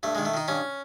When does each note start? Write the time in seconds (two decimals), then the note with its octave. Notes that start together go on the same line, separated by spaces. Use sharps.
0.03 G2 A3
0.15 G#3
0.18 D#3
0.25 A3
0.34 D#3 D#4
0.48 G2 C#4